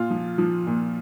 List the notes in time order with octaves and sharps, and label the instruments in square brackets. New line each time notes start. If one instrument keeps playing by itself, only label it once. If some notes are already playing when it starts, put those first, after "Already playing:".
Already playing: [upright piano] A#2 F4
F3
F3
A#2